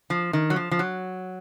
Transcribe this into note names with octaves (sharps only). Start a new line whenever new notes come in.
F3
D#3
F#3
F3
F3
F#3